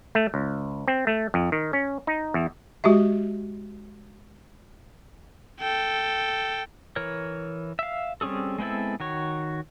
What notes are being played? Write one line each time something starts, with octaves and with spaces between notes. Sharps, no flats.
A3
C#2
C4
A3
F2
D#3
C#4
D#4
E2
G#3 F#4 G4 E5
A4 G5
E3 A#4 C#5
E5 F5
G3 C4 C#4 G#4 A4
G#3 B3 C4 E4 A4
D#3 F#4 C#5